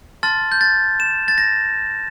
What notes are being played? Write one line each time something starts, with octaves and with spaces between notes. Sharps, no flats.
A5 C6 F6 A6
G6
A6
E7
A6
A#6